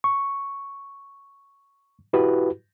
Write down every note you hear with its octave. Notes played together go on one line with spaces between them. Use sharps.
C#6
E4 F#4 G4 B4